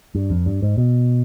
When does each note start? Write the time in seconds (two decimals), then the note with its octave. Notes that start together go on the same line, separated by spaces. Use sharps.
0.15 G2
0.30 F2
0.46 G2
0.62 G#2
0.78 B2